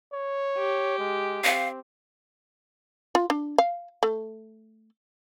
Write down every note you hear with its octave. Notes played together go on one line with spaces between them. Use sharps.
C#5
G4
G#3
C4 F5
F4
D4
F5
A3